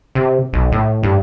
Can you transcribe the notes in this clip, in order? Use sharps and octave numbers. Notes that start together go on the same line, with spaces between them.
C3
B1
A2
G2